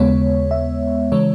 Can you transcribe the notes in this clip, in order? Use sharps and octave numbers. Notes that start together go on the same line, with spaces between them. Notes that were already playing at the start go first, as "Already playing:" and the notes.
Already playing: D#2 C#3 G#3 B3 C#5
E5
C#3 E3 G#3 C#5